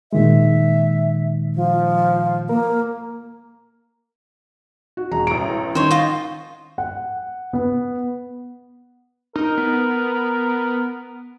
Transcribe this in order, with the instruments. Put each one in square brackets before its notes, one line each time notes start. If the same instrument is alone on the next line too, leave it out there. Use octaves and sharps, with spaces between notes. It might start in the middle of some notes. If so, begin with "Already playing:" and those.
[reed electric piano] A#2 D#3 G#3 [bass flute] E5
[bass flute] F3
[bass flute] A#3 [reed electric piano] A#4
[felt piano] F#4
E1 A#5
[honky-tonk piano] A1 A#5 [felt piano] D7
[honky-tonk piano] D#3 [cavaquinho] C5 C#5
[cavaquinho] F4 D#5
[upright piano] F#5
B3
[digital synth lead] D#4 [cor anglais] A#4
[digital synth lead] B3